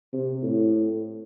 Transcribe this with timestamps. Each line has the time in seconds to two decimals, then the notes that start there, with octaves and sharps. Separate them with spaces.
0.13 C3
0.43 A2